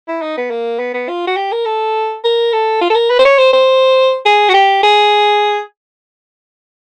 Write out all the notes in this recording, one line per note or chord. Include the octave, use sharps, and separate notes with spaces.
E4
D#4
B3
A#3
B3
B3
F4
F#4
G4
A#4
A4
A#4
A4
F4
A4
A#4
B4
C5
C#5
C5
C5
G#4
F#4
G4
G#4